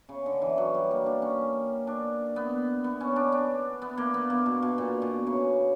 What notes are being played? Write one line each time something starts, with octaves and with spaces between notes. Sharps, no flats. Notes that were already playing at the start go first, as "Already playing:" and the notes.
C#3
D3
E3
F#3
G3
A#3
D4
C#4
D4
B3
B3
C#4
D4
D4
B3
A#3
B3
A#3
B2
B2
A#2
B2
C#3